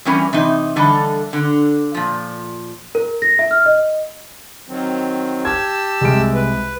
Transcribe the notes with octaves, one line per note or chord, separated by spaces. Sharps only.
E2 E3 G3 C#4 A#4 G#5
C3 E3 D#4 D#5
D3 E3 G3 A4 D#5
D3
A#2 F3
A#4
A#6
E5
F6
D#5
D#3 F#3 C4
G4 A5 E6 G#6
C2 G#3 D7
B4